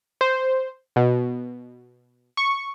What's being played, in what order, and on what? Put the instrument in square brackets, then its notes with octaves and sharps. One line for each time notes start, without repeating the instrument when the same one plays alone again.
[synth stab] C5
B2
C#6